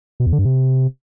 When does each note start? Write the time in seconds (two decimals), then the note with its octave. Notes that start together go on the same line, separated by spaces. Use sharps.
0.20 B2
0.26 E2
0.32 D3
0.39 G2
0.45 C3